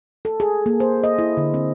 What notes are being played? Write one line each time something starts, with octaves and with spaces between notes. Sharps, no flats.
A4
G#4
A#3
C5
D#5
E4
D3
C4